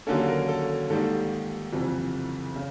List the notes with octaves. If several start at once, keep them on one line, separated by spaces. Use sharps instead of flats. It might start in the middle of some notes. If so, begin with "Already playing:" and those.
D#2 D3 F#3 A#3 C#4 A4
A#4
A4
G#2 D#3 G3 A#3 A4
F#1 F2 C3 E3
C#3